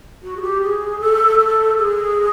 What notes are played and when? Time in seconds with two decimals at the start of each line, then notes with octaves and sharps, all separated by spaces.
0.22 F#4
0.37 G#4
0.42 G4
0.62 G#4
1.00 A4
1.39 A4
1.77 G#4